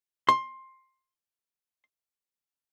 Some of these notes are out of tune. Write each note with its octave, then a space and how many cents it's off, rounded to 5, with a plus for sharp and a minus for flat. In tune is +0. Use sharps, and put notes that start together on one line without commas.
C6 +15